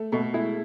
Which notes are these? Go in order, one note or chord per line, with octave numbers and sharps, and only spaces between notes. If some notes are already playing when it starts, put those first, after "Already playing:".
Already playing: A3 A4
B2 A3 A4
G#3 E4 G#4